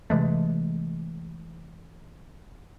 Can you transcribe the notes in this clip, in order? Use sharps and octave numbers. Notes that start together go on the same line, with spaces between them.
C3 E3 G#3 A3